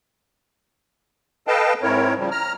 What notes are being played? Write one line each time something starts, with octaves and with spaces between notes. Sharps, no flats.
A4 B4 D#5 F5 G5 A5
G#2 C4 E4 A#4 C#5
C#3 F3 G3
A#5 F6